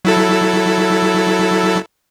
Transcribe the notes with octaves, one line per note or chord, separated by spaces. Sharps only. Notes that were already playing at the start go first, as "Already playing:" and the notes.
F#3 E4 A4